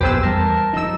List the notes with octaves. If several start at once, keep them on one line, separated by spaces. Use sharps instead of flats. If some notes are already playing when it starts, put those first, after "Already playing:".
A#1 F2 B3 G4 G#4 B4 C5 E6
E2 G3 A3 A#4 A5
G2 F3 D#4 E6